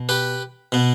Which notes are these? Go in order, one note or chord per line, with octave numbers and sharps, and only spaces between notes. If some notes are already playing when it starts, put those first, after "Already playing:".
Already playing: B2
G4 B4
B2 B3